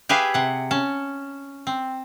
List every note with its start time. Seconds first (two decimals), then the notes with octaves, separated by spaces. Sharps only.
0.09 G4 G#4 B4 E5 F5
0.34 C3 F#5
0.71 C#4 A5
1.67 C4